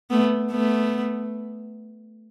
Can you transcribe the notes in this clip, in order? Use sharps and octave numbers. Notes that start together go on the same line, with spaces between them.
A3 B3
A3 B3